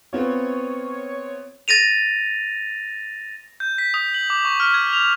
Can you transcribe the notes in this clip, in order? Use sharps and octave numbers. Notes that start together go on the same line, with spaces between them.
B3 C4 F4 C#5
A6 A#6 D#7 F7
G6
B6
D#6
F#7
D6
C#6
F6
G#6
F7